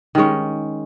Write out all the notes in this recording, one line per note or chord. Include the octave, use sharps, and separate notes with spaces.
D#3 G#3 C#4